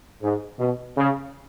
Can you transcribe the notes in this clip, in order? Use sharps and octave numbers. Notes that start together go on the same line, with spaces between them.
G#2
B2
C#3